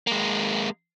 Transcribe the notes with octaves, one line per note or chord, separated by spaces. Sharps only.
G#3 A#3